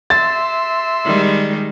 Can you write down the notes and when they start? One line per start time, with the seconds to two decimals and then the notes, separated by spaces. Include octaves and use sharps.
0.10 E5 C6 A6
1.05 D#3 G3 G#3